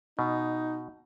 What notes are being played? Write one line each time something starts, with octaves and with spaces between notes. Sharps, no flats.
B2 D#4